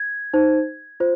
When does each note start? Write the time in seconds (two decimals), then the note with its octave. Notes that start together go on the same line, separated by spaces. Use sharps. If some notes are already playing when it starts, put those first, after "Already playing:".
Already playing: G#6
0.34 D#4 C5
1.00 F4 C5